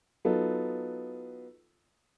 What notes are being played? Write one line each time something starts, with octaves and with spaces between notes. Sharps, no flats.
F#3 B3 D#4 F4 A4